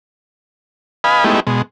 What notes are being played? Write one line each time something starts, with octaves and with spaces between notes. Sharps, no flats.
B4 D#5 F5 G#5 B5
G#3 A3 B3 D#4 E4 G4
B2 G#3